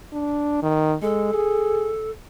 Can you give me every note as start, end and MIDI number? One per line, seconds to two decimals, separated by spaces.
0.13 0.62 62
0.63 0.95 51
1.02 1.33 56
1.02 2.11 69
1.34 1.91 68